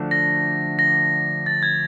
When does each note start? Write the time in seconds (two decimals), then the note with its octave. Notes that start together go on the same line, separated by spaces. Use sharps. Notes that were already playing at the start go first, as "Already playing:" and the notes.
Already playing: D3 F3 A3 D4 F#4
0.11 A#6
0.79 A#6
1.46 A6
1.63 G#6